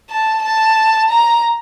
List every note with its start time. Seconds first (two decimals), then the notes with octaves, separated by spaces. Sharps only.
0.10 A5
0.43 A5
1.10 A#5